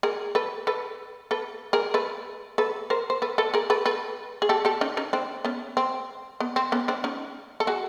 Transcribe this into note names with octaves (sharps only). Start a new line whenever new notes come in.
G#4 A#4
A4 B4
A4 B4
A4 B4
G#4 A#4
A4 B4
A4 B4
A#4 C5
C5
A4 B4
A4 B4
G#4 A#4
A4 B4
A4 B4
G#4
G4 A4
G4 A4
C#4 D#4
C#4 D#4
C4 D4
B3 C#4
C4
B3
C4
B3 C#4
C4 D4
C#4 D#4
A4
F#4 G#4